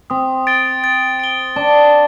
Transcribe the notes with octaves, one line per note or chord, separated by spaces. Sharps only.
C4 D#6
A6 D7 G7
A6
D7 G7
D4 D6